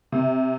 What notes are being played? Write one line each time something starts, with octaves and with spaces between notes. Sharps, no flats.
C3